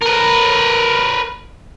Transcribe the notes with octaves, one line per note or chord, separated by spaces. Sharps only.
A#4 B4